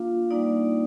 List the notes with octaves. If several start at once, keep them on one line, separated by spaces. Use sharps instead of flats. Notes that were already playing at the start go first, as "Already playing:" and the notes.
Already playing: A#3 D4 F4 F5
G3 A#3 D4 D#4 D5